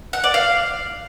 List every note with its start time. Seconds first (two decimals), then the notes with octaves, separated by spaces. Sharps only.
0.13 F#5
0.24 D5
0.34 F5